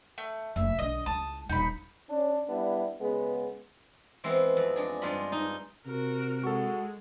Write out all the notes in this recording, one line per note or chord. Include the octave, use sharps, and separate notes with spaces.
A3
F1 A#3 E5
B1 D3 D#5
C#2 E4 A5 D#6
D#1 D#4 B5
C#4 D4
G3 B3 D4 E4
C#3 G#3 B3
E3 G#3 B3 C4 E4
F2
G#3 D4 G#4
G2 G#3 F4 D#5 B5
D#4
C3 F#4 A#4
G#3 F#4 A4 C#6